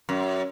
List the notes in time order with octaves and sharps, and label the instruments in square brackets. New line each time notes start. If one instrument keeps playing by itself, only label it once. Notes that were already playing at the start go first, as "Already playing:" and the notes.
[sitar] F#2